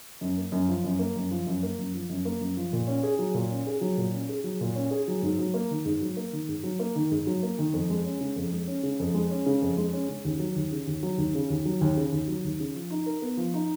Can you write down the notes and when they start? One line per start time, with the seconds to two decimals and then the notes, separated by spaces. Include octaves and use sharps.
0.21 F#2
0.38 A#3
0.52 F#2
0.68 F3
0.84 F#2
0.99 A#3
1.16 F#2
1.31 F3
1.47 F#2
1.63 A#3
1.78 F#2
1.94 F3
2.10 F#2
2.25 A#3
2.41 F#2
2.57 F3
2.73 A#2
2.87 C#4
3.03 G#4
3.19 F#3
3.34 A#2
3.50 C#4
3.67 G#4
3.81 F#3
3.97 A#2
4.13 C#4
4.29 G#4
4.44 F#3
4.61 A#2
4.76 C#4
4.91 G#4
5.08 F#3
5.23 G#2
5.39 F#3
5.54 A#3
5.70 D#3
5.85 G#2
6.01 F#3
6.17 A#3
6.33 D#3
6.48 G#2
6.63 F#3
6.79 A#3
6.95 D#3
7.11 G#2
7.27 F#3
7.43 A#3
7.58 D#3
7.73 F2
7.90 G#3
8.05 C#4
8.21 C#3
8.36 F2
8.52 G#3
8.67 C#4
8.83 C#3
9.00 F2
9.14 G#3
9.30 C#4
9.46 C#3
9.62 F2
9.77 G#3
9.93 C#4
10.09 C#3
10.25 D#2
10.39 F#3
10.56 D#2
10.72 C#3
10.87 D#2
11.03 F#3
11.18 D#2
11.35 C#3
11.50 D#2
11.65 F#3
11.81 D#2
11.97 C#3
12.12 D#2
12.28 F#3
12.44 D#2
12.60 C#3
12.75 F3
12.91 D#4
13.06 A#4
13.22 B3
13.37 F3
13.54 D#4